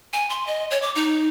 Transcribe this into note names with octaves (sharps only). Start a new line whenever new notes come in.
G#5
C6
D#5
C#5
D6
D#4